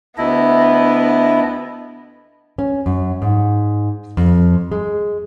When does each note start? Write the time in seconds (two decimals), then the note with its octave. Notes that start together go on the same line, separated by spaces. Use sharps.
0.18 D2 B3 D4 E4 D#5
2.58 C#4
2.86 F#2
3.22 G#2
4.17 F2
4.72 G#3